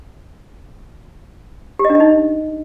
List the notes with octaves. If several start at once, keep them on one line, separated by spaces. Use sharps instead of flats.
G4
D#5
D4
D#5
D#4